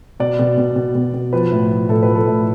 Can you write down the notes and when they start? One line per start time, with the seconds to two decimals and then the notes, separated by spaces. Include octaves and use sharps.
0.20 B2 D5
0.39 B2
0.58 B2
0.76 B2
0.95 B2
1.14 B2
1.33 F3 B4
1.52 A2
1.70 F3
1.89 A2 A4
2.03 B4
2.08 F3
2.15 A4
2.27 A2